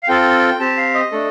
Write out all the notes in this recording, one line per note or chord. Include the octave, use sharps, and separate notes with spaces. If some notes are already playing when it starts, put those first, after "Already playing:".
F5
C4 F4 A4 G5
C4 G4 A5
F5
D#5
A3 D4 A4